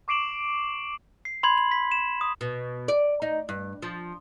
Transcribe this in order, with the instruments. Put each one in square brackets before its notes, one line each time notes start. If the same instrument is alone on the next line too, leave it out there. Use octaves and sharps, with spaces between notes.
[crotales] C#6 D6 C7 D7 E7 F#7
[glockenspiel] C7
B5 C6 G#6
F#7
B6
E7
D#6
[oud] B2
D5
D#4
G2
F3